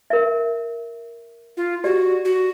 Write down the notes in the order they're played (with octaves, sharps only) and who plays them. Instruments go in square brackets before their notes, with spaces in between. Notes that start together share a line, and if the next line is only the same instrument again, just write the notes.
[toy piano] A#4 E5
[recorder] F4
[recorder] F#4 [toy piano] G4 D5
[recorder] F#4